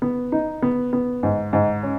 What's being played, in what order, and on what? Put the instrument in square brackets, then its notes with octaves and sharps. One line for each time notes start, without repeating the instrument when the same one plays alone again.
[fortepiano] B3
D#4
B3
B3
G#2
G#2
C#4